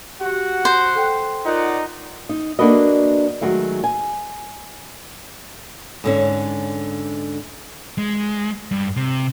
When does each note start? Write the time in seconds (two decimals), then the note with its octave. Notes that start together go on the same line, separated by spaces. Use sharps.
0.21 F#4 G4 F#5
0.65 C5
0.95 A4 G5
1.45 D#4 F4 A#4 D5 D#5 F#5
2.29 D#4
2.59 A#3 D4 F#4 A4 B4 D#5
3.41 D#3 F#3 G#3 A3
3.84 G#5
6.04 G#2 D3 C#4
7.98 G#3
8.71 G2
8.96 C3